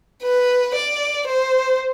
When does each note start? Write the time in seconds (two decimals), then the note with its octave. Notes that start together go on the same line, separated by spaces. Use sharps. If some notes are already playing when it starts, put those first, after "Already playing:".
0.23 B4
0.75 D5
1.28 C5